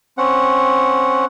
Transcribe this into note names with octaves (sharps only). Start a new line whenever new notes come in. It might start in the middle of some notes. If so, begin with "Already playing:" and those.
C4 C#4 F#5